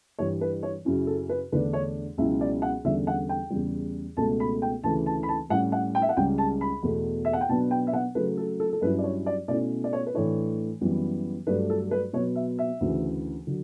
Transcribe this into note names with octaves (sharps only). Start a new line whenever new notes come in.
G2 E3 G3 C#5
B4
C#5
F#2 C#3 F#3 C#4 E4
A4
B4
E2 D3 A3 D4 B4
C#5
C#2 B2 F#3 C#4 E4 E5
D5
F#5
E2 D3 G3 C#4 E5
F#5
G5
E2 C#3 G3
C#2 B2 A3 A5
B5
G5
D2 C#3 E3 A3 A5
A5
B5
A5
A2 G3 C#4 F#5
F#5
G5
E5
F#5
C#2 C#3 G3 C#4 G5
A5
B5
E2 B2 A3
E5
F#5
G5
B2 F#3 B3 D4 A5
G5
E5
F#5
C#3 F#3 A3 B4
A4
A4
A4
G2 F#3 C#4 E4 B4
D5
C#5
D5
B2 A3 C#4 E4 D5
D5
C#5
B4
A2 E3 A3 D4 C#5
F#2 E3 G3 B3
G2 F#3 A3 D4 B4
A4
B4
B2 F#3 B3 C#5
E5
E5
D2 C#3 E3
D3 F#3